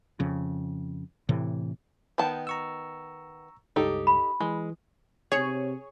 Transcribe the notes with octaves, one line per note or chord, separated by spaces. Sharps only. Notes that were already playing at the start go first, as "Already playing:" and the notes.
F2 C#3
A2 C3 E3
D#3 B3 G5 A5
A#5 C#6 E6
C#2 G2 D#4 G4 A4
B5
E3 G#3
C3 G#4 C#5